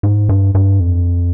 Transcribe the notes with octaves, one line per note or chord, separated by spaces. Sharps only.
G#2
G2
G2
F2